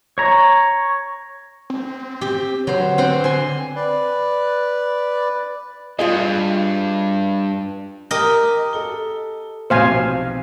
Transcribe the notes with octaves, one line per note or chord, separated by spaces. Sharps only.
C#5 A#5
C4
G4
D3 F#3 C5
C4 C5 F#5
G#5 C6
B4 D5
G2 F4 G#4 D#5
G4 A#4 D#5
A4 G7
B1 F2 C3 C5 F5 G#5